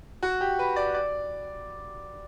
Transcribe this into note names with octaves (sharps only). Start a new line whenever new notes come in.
F#4
G4
B4
D5
D5